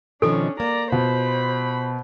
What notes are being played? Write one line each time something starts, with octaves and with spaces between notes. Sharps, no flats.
B2 D#3 F3 C#4 D4 A4
A#3 D5 A#5
B2 F4 C5 B5